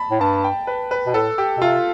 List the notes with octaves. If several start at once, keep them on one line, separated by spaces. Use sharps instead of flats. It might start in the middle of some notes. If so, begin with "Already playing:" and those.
Already playing: A5 B5
A2
G2 A5
G5
B4
B4
B2
A2 A4
G4
B2
C3 F4